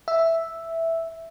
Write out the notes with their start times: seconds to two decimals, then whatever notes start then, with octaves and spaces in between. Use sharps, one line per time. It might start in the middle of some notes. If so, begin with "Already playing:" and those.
0.08 E5